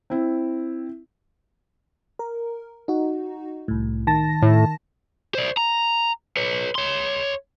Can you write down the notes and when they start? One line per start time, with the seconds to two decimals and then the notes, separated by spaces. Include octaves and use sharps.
0.10 C4 E4
2.19 A#4
2.88 D#4 F#4
3.68 C2 A2
4.07 D#3 A5 A#6
4.42 A2
5.35 C5 D5
5.57 A#5
6.37 B4 C#5
6.75 C#5 C6